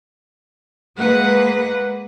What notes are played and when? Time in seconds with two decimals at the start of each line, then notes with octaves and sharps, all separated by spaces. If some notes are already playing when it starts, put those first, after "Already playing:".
0.98 G#3 A#3 B4 F#5